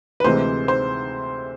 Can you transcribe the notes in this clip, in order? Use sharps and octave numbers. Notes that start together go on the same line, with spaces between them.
B4
D2 C3 E3 G#3 C5
C5